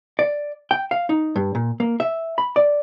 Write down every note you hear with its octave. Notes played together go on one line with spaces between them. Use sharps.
D5
G5
F5
D#4
G2
A#2
A#3
E5
B5
D5